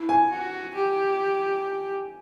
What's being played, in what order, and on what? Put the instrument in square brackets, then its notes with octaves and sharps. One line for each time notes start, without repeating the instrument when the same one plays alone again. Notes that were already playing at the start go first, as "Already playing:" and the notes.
Already playing: [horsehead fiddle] E4
[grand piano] G#5
[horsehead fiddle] F#4
G4